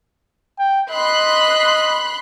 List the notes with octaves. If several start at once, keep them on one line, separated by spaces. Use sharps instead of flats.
G5
D#5 B5 C6 F#6